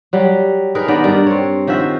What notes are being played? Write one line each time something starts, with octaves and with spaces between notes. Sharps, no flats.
F#3 G3
D#4 G#4 A#4 B4
D#3 B3 D5
G2 D4 A#4
C4 C#5
D#3 F3 F#4 E5